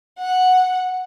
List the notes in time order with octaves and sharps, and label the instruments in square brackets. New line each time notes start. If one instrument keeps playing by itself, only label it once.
[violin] F#5